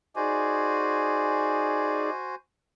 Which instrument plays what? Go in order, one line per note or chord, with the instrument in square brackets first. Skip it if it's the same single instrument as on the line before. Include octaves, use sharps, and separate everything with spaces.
[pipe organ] D#4 G#4 D5 [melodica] F#4 C5 G#5